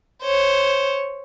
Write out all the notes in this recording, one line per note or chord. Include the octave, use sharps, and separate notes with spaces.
C5 C#5